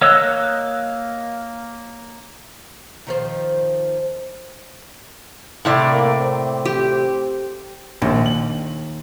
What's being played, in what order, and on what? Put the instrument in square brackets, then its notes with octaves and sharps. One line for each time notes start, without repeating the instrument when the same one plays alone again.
[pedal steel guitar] A#3 C#5 D#5 E6 F#6
[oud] D#3 F3 C5
[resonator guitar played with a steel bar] A2 C3 D5
[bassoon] A#3
C4
[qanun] G4
[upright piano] A#1 [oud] D#2
[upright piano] F#7